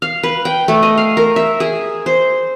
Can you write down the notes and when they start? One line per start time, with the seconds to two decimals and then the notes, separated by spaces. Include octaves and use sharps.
0.02 F5
0.23 B4
0.45 G5
0.68 A3
0.83 D#5
0.98 F5
1.17 A#4
1.36 E5
1.60 G#4
2.06 C5